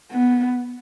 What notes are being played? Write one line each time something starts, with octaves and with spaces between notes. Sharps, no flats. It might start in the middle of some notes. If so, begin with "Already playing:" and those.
B3